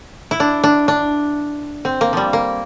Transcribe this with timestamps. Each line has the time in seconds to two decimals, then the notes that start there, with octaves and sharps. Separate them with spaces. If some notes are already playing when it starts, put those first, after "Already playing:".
0.31 E4
0.40 D4
0.64 D4
0.88 D4
1.85 C4
2.01 A#3
2.13 F3 G3
2.33 A#3